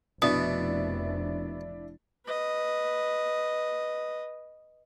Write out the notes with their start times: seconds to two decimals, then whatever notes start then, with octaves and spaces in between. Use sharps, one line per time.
0.22 F1 B2 D4 E4 D#6
2.26 B4 D#5